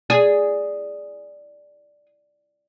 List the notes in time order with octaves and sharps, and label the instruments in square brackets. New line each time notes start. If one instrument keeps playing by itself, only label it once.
[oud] G#4 [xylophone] D5